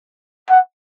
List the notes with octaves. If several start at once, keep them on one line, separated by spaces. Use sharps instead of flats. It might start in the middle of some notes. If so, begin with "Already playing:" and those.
F#5